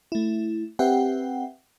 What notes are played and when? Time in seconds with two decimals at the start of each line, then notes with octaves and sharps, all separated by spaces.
0.12 A3 E4
0.79 C4 G4 B4 E5 F#5 G5